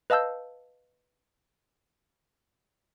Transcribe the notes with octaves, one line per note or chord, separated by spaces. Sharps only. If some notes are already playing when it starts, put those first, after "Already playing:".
B4 D#5 F5 A5 E6 G6